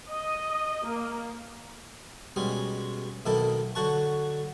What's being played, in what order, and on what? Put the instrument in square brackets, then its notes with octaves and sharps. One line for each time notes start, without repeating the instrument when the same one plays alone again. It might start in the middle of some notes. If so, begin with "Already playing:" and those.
[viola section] D#5
A#3
[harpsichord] B2 G3 G#3 C#4 G#4
B1 B2 D#3 A#3 E4 A4
D3 F#3 F#4 F#5 A5 C#6